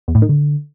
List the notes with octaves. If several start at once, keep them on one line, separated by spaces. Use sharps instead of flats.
E2
A2
D#3
D3